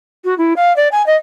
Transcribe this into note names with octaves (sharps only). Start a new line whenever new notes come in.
F#4
E4
F5
D5
G#5
D#5